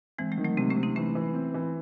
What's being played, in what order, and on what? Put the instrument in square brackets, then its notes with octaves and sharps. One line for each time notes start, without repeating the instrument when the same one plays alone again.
[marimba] E3 G#3 [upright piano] C4
[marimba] F#3 A3
[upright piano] D#3
[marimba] F#3 A3
[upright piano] C3 [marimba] G#3 C4
[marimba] A3 C#4
[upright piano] C3
[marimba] C4 D#4
[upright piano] E3 [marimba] A3 C#4
[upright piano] E3
C4
E3